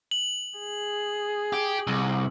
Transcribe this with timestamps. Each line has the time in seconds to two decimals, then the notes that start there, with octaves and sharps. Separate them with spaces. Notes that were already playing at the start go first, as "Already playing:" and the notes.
0.11 F#7
0.58 G#4
1.53 G4
1.87 C2